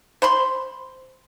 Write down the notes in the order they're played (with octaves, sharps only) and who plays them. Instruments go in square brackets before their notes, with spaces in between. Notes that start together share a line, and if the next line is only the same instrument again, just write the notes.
[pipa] C5 B5 C6